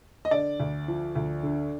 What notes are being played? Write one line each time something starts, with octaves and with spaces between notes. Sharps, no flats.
D#5
D3 D5
D2
F3
D2
D3